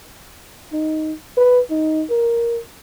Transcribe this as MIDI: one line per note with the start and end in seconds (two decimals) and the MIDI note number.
0.72 1.12 63
1.37 1.60 71
1.70 2.04 63
2.10 2.59 70